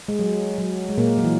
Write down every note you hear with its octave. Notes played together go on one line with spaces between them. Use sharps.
G#3
F#3
F#3
G#3
A#2 A#3
F#3
E3